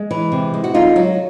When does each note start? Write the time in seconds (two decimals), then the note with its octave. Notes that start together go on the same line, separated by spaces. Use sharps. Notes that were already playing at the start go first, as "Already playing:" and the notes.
Already playing: G#3
0.11 E3
0.32 C3
0.54 G#3
0.64 F#4
0.74 D3 D#4 F4
0.96 F#3